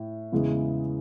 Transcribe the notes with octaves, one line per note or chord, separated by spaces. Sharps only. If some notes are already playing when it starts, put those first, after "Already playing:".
Already playing: A2
E2 C#3 E3 G#3